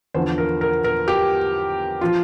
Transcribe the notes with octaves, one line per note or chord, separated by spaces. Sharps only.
E2 D3 F3 C5
A#4
A#4
A#4
G4
F3 F4